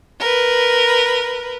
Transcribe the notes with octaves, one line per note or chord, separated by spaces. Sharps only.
A#4 B4